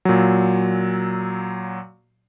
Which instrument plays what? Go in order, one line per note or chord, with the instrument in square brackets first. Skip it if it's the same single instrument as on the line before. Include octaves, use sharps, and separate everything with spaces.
[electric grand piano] A#2 F#3